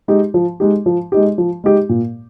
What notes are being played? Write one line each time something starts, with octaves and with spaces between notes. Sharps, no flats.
G#3 D#4 G4
F3
G#3 D#4 G4
F3
G#3 D#4 G4
F3
G#3 D#4 G4
A#2